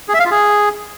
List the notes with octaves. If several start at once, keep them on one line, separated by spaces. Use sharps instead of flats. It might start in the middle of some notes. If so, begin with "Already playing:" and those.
G#4
E5
F5
F4
G#4